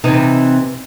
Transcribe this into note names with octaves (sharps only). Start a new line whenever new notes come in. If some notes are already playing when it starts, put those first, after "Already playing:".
C3 E3 D#4